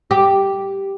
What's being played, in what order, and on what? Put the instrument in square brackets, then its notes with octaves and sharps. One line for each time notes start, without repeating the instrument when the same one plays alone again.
[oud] G4